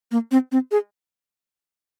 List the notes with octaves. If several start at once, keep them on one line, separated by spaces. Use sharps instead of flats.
A#3
C4
C4
G#4